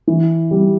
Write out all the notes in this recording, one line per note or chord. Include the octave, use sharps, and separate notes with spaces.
E3
G3